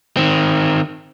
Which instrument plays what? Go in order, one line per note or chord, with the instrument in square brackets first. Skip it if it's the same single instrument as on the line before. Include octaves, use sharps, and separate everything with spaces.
[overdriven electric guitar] D#3 C4